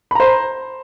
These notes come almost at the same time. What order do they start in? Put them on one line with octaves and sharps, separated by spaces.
B5 A#5 C5